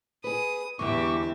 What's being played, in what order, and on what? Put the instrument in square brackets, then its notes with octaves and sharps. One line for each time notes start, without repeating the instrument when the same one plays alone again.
[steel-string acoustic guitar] G#4 B4 [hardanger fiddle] D#6
[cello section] E2 [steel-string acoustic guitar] D3 E3 G#3 [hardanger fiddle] G4 E5 [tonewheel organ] C#6 D6